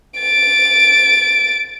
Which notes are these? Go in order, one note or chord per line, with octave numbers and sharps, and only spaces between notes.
A6 D7